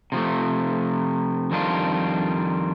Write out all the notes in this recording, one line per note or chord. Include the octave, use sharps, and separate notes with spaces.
C3 F3 A3
F2 D#3 G3 D4 F4